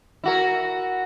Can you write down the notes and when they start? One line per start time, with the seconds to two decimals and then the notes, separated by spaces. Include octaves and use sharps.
0.24 E4 F#4 A#4